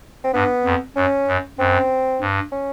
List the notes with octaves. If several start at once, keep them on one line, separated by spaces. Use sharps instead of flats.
C4
G2 B3
F2
F#2 C#4
F#2
F#2 C4
G2
C#4